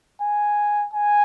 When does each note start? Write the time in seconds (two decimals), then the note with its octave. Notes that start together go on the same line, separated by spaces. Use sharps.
0.22 G#5
0.93 G#5